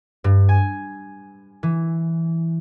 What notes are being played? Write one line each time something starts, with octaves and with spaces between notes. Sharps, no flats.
G2
G#5
E3